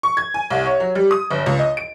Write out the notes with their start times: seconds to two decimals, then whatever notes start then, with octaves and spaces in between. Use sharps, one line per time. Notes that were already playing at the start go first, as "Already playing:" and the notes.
0.03 C#6
0.17 G#6
0.34 G#5
0.50 C2
0.66 C#5
0.80 F#3
0.95 G3
1.11 D#6
1.31 G1
1.46 C#2
1.59 D#5
1.77 D7